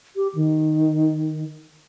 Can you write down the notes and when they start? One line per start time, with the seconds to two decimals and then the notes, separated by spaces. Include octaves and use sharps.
0.16 G4
0.35 D#3